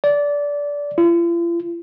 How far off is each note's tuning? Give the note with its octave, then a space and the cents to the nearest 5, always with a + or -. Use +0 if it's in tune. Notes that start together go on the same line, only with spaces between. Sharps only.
D5 -20
F4 -45